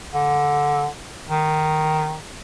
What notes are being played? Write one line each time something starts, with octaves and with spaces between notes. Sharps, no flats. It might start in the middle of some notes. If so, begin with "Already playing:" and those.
D3
D#3